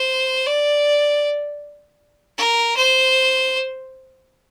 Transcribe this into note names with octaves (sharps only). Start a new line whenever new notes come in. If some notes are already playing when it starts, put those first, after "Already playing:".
Already playing: C5
D5
A#4
C5